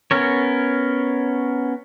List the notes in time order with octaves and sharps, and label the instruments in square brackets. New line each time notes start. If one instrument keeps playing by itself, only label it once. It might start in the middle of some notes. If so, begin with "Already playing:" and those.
[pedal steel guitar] B3 C#4 A#4 C#5